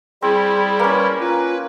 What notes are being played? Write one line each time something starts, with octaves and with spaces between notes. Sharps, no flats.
G3 C4 E4 G#4
A#3 C#4 B4
F4 B4